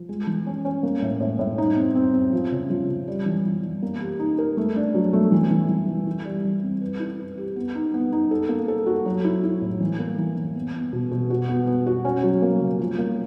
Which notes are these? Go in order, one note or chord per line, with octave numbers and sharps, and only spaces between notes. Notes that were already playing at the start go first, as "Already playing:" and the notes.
Already playing: F3
G#3
E3
C#4
C#4
A#3
A2
A2
A2
D#4
C4
C4
C4
F3
C#3
F3
C#3
G3
E3
E3
E3
A#3
G4
D#4
A#4
A3
D4
F#3
A3
E3
E3
E3
E3
E4
G3
E3
C4
B4
E4
B4
G4
B3
D#4
B3
D#4
A4
A#3
A4
F#4
F#3
E4
E4
A2
E3
A#3
E3
E3
B3
B3
B2
B2
F#4
B3
B3
F#4
C#4
F#3
A#3
C#3
F3
A#3